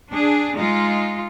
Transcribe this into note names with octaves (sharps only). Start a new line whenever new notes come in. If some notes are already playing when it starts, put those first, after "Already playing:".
D4 G#4
G#3 D#4 F4